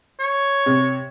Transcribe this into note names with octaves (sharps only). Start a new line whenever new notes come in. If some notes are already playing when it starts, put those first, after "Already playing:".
C#5
C3